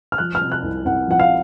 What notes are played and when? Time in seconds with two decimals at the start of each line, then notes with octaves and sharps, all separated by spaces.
0.12 F6
0.18 F3 F#6
0.35 F6
0.41 C3
0.52 F#6
0.63 C2
0.85 C2 F#5
1.07 F3 F#5
1.19 F5